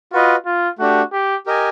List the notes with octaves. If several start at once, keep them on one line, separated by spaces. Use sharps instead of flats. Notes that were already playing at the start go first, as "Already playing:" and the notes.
F4 F#4 B4 D#5
F4
A3 D4 F#4 G4
G4
G4 A#4 D#5 G#5